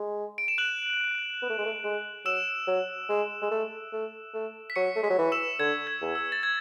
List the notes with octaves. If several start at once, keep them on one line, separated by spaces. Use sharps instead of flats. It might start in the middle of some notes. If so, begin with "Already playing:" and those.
Already playing: G#3
D7
E7
F#6 F#7
B3
A3
G#3
A3
G#3
F#3 E6 E7
F#3
G#3
G#3
A3
A3
A3
B6
F#3 C#6 C#7
A3
G#3 B6
F#3
E3
E6 E7
D3 G#6
G#6
E2
E6
A6
G#6